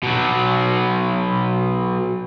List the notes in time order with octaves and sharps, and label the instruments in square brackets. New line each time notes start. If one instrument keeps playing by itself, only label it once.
[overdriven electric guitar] B2 F#3